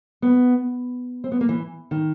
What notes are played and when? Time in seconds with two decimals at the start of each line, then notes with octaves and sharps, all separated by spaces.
0.22 B3
1.24 C4
1.32 B3
1.41 A#3
1.49 E3
1.91 D#3